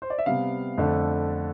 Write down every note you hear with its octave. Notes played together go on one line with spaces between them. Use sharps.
C5
D5
E5
C3 G3 B3 F5
F2 D3 A3